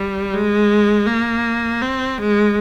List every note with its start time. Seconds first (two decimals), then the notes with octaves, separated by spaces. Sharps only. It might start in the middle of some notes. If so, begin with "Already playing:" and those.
Already playing: G3
0.34 G#3
1.07 A#3
1.82 C4
2.18 G#3